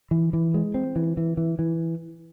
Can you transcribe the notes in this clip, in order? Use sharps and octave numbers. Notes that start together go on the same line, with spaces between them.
E3
E3
G#3
C4
E3
E3
E3
E3